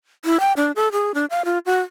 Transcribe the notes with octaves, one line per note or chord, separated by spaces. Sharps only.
E4
G5
D4
A4
G#4
D4
F5
F4
F#4